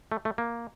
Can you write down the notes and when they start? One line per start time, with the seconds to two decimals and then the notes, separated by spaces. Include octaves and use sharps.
0.12 A3
0.25 A3
0.38 A#3